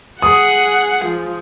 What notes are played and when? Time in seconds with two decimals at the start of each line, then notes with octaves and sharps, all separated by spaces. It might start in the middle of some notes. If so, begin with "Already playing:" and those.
0.22 G#4 F#5 D#6
1.05 F3